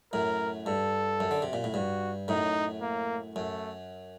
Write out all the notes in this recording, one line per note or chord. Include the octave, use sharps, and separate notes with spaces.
F#2 A2 A#4
G2 A4
F#2
D3
C3
A#2
A2
G2 F#4
F#2 A2 D#4
A#3
F#2 A3